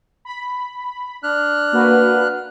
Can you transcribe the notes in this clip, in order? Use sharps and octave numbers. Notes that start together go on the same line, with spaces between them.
B5
D4 F6 F#6
A#3 F#4 B4